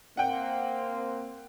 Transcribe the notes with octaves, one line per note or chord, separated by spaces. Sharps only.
A#3 C4 F#5 G5